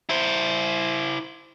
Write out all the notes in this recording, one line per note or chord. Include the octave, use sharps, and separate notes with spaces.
E4 C5